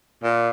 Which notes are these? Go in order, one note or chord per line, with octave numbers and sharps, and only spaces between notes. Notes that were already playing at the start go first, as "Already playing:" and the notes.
A#2